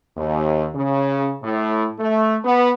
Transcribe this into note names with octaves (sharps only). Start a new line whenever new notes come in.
D#2
C#3
A2
A3
B3